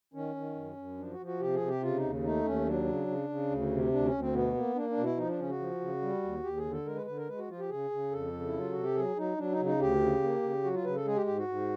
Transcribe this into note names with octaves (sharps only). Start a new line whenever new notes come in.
D#3 C#4
D#3
F#2
F#2
F3 D4
F#4
F3
F#4
C3 G4
G#4
C3
G4
C#3 F4
D#4
D#2
A3 D#4
D#2 C#4
F#3 D4
C#3
C#3
C#3
D2
C3
D2 D4
C#4
D2
C4
B2 B3
A#3
A#3 D4
D4
B2
E4
F3 D#4
D4
C#3 C#4
F#4
F3
C#3
G3
D#2
D#2 G4
G#4
D3
A4
G#3 A#4
B4
D3 B4
A#4
G#3 B4
F#4
F3 F4
G4
C#3 G#4
C#3
F2 A4
C#3
E4
F#3
F4
C3 F#4
G4
F#3 G#4
F#3 D#4
F#3 D4
D#4
C#3
D#4
D2 G4
C#3
A#3
C#3
F#3 F#4
F4
C#3 B4
A4
G#3 G#4
G4
G#2 G4
F#4
G#2